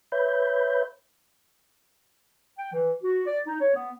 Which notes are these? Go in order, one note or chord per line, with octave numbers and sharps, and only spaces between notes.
B4 C#5 E5 B5 G6
G5
E3
F#4
D5
D#4
C#5
B3